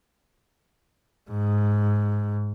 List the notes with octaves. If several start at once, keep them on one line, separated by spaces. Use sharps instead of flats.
G#2